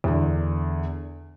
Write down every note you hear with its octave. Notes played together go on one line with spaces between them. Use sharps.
E2 D3